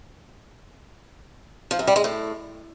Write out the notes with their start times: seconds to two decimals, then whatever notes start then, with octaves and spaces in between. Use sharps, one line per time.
1.71 F3
1.79 F#2
1.87 G3
1.96 G#3
2.04 A2